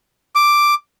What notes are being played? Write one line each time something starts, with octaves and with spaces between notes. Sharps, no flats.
D6